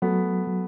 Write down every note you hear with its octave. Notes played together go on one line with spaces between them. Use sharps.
F#3 A3 B3
F#3